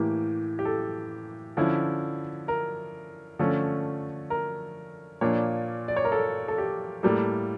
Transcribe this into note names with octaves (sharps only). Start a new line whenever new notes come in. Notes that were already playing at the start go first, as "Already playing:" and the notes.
Already playing: A2 E3 A#3 G4
G4
A4
D3 F3 C#4 E4
A#4
D3 F3 A3 C#4 A4
A#4
A#2 F3 A#3 D4 C#5
D5
C#5
A#4
A4
A4
G4
A2 G3 A#3 A4